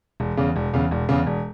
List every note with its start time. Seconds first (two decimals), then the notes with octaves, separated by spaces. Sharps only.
0.20 E1
0.37 E2 C#3
0.56 E1
0.73 E2 C#3
0.91 E1
1.09 E2 C#3
1.27 E1